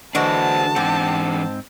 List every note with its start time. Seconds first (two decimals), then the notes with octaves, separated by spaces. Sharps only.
0.15 D3 E3 G#3 D4 F#4 C5 A5
0.76 G#2 E3 C4 D4 G4 F#5